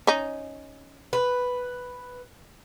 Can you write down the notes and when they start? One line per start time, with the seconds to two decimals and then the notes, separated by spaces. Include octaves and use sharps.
0.07 C#4 D#4
1.13 B4